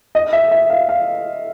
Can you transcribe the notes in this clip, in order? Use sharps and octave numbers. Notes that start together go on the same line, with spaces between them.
D#5
E5
E5
F5
F5